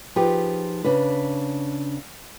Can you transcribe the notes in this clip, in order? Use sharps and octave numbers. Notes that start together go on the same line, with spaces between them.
F3 D#4 F4 G4 G#4 B4
C#3 D4 B4